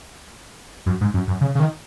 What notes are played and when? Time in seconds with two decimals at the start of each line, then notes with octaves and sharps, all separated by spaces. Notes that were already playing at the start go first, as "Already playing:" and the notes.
0.86 F#2
1.01 G#2
1.14 F#2
1.28 F#2
1.41 C#3
1.55 C#3
1.60 D#3